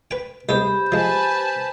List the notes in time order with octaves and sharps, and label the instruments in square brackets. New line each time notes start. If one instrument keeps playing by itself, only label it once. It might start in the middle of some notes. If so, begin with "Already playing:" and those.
[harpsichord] B4 G5
[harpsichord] C2 G#3 B3 [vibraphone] G4 B5 [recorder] C5
[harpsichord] F3 G#3 [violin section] B4 G#5 A5